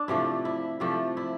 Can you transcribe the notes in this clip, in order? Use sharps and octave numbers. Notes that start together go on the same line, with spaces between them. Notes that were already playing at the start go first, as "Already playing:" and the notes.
Already playing: D4
C3 F3 A3 E4
E4
C3 F3 A3 E4
E4